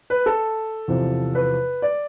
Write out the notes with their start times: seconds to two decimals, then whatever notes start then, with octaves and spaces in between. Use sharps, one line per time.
0.10 B4
0.26 A4
0.88 E2 C3 F3
1.35 B4
1.82 D5